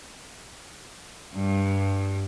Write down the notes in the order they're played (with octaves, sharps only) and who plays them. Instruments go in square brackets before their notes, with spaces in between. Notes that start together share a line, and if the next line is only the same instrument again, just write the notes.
[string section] G2